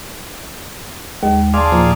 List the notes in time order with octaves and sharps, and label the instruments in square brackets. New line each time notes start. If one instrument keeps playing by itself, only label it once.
[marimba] D#2 [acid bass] G#3
[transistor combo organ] G#4 D5 F5 [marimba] A5 C6
[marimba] A#2 A#3 [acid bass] F3